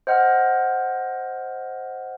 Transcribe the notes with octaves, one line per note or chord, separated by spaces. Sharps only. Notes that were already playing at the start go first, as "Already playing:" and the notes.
C5 D#5 F#5 F6